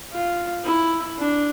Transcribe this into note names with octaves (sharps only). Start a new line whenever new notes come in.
F4
E4
D4